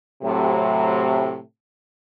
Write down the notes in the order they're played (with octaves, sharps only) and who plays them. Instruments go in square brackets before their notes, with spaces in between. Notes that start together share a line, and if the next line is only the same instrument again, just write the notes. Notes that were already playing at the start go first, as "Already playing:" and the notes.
[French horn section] A2 C3 F#3